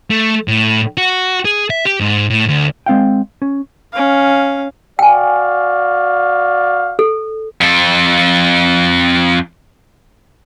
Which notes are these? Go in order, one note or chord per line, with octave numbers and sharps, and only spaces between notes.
A3
A2
F#4
G#4
E5
G4
G#2
A2
D2
G#3 C4 F5 G5
C#4
C#4 F5
F#4 D5 F5 G5 G#5
A4
F2 A4